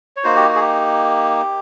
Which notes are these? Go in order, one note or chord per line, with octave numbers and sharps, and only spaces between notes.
C#5
A#3 D#4 F#4 C5
G4
F#4
G#4
G4